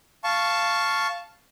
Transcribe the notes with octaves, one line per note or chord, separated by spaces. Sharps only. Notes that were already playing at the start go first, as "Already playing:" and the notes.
F5 A5 C#6